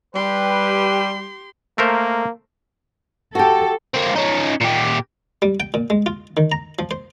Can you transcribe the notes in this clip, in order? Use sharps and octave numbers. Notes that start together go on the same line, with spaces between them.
G3 G4 B4 G5 C6
A3 A#3 A#4 C5
F#4 G4 A4
A#3 C4
C#4 D#4
A#2 G4
G3
G5
A#2
G#3
F4
D#3
A#5
F3
C5